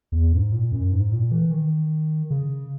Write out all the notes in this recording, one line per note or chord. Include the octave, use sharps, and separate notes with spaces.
E2
G#2
A#2
F#2
G#2
A#2
E3
D#3
C#3